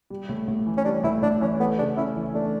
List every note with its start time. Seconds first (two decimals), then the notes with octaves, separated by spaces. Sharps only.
0.10 G3
0.29 A2
0.48 A2
0.66 E3
0.77 C#4
0.85 G3 D4
1.03 A2 E4
1.22 A2 D4
1.41 E3 C#4
1.60 A3 B3
1.78 C#3 D4
1.97 C#4 E4
2.16 E3
2.35 A3 D4